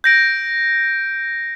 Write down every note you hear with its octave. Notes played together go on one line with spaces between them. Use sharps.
G6 A#6 D7